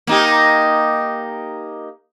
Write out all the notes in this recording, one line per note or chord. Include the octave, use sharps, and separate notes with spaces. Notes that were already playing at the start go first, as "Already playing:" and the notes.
A#3 D#4 G4